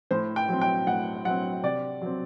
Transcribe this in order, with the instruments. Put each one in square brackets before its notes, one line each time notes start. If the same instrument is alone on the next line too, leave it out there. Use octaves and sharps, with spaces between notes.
[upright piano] A2 C5
G5
F#3 C4
G5
A2 F#5
F#3 C4 F#5
C3 D5
F#3 C4